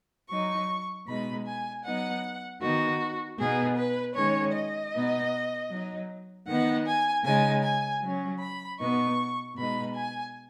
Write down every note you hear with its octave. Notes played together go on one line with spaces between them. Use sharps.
F#3 D#4 C#6
B2 G#3 D#4 B5
G#5
F#3 B3 D#4 F#5
D#3 B3 D#4 F#4
B2 B3 D#4 G#4
B4
D#3 G#3 C#4 C#5
D#5
B2 B3 D#4
F#3 D#4
D#3 B3 D#4 F#5
G#5
C#3 G#3 D#4 G#5
G#5
F#3 C#4
B5
B2 B3 D#4 C#6
B2 G#3 D#4 B5
G#5